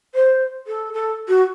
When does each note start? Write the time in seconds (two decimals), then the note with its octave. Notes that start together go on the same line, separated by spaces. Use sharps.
0.15 C5
0.67 A4
0.93 A4
1.28 F#4